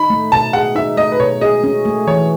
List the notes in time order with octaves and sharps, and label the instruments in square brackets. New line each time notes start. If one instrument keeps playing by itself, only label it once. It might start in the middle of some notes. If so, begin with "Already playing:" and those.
Already playing: [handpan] D#4 [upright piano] B5
[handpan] A3
[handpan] B2 [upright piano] A5
[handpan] G#4 [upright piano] F#5
[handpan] D#4 [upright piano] E5
[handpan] A3 [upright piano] D#5
[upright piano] B4
[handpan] B2 [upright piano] C#5
[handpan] G#4 [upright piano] D#5
[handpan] C#4
A3
[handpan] E3 [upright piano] C#5